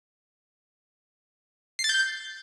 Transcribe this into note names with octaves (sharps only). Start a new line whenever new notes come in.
C7
A6
G6